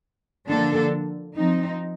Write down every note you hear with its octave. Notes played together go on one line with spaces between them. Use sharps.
D3 F3 A#3 D4 A4
F3 C4 D#4